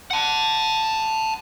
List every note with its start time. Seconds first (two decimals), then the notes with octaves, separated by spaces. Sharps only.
0.11 F#5 A5